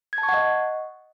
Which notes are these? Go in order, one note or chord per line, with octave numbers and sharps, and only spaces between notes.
G#6
A5
C#6
F#5
D#5